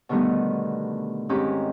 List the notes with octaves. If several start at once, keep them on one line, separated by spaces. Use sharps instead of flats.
B2 D3 D#3 G3 A3 B3
G#2 D#3 C4 C#4 E4 G4